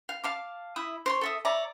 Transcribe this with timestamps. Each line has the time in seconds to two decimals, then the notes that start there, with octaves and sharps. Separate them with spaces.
0.09 F5
0.24 F5 A5 D6
0.76 E4 E5 D#6
1.06 C5 C#5 C6
1.21 A4 E5 D#6
1.45 C#5 D5 E5 A#5